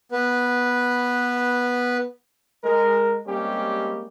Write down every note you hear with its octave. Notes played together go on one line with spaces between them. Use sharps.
B3 B4
G#3 A#4
G3 G#3 A#3 C4 C#4 G4